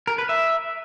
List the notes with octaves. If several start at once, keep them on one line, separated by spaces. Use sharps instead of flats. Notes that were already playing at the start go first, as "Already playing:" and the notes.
A#4
B4
E5